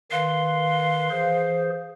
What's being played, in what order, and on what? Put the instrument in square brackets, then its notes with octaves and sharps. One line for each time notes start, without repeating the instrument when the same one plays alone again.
[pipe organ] D#3 B4 C6 [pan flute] F5
[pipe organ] E3 G#4 C5